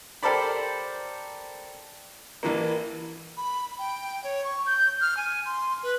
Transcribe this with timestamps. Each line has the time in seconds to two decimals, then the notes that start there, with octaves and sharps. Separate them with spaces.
0.23 G4 A4 A#4 C5 D5 B5
2.43 A1 E3 A#3
3.37 B5
3.79 G5
4.24 C#5
4.44 C#6
4.66 G6
5.01 F6
5.17 G#5
5.46 C6
5.83 B4